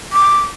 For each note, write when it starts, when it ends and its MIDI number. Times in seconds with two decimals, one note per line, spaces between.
0.13 0.39 86